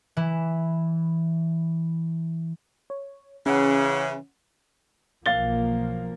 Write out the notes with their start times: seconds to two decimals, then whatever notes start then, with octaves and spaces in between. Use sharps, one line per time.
0.17 E3 E4
2.90 C#5
3.46 C#3 E3 C#4 F#5
5.26 B1 F3 A#3 F5 A6 G7